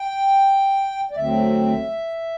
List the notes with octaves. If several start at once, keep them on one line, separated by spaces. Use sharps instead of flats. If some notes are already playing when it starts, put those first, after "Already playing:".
Already playing: G5
D5
D2 D3 F#3 C4 E5